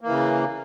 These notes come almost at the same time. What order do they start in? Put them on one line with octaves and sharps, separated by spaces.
A#3 E3 C#3